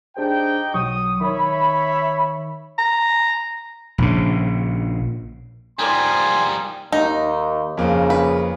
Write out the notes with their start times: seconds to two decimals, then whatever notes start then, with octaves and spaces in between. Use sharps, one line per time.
0.17 D4 D#4 G4 G#4 C5 G5
0.74 B1 F#3 C#6 D#6
1.21 D#3 C#5 E5 B5
2.78 A#5
3.98 A#1 C#3
5.79 F3 G3 D#4 A#4 D5 G#5 C6
6.92 D#2 D#4
7.77 F2 C#3 A#3
8.10 B4